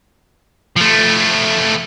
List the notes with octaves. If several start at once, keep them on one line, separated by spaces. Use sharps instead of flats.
F3 A3